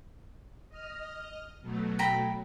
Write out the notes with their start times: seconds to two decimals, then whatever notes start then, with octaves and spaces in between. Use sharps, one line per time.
0.69 D#5 F6
1.62 B2 F#3 A3
1.99 G5 A#5 B5